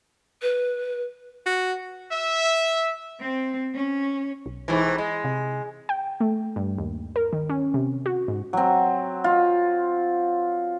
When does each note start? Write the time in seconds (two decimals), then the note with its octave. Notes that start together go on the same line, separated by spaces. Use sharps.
0.42 B4
1.46 F#4
2.12 E5
3.20 C4
3.75 C#4
4.46 B1
4.68 G#2 C3 E3
4.98 G#3
5.24 C3
5.89 G5
6.20 A3
6.56 G2
6.78 D#2
7.16 A#4
7.33 D#3
7.49 C#4
7.74 C3
8.06 F#4
8.28 G#2
8.53 F#3 C4
9.24 F4